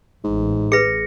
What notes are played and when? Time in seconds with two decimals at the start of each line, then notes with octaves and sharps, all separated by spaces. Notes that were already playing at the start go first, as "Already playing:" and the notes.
0.24 A1 G#2
0.72 G#4 B4 A#6 C#7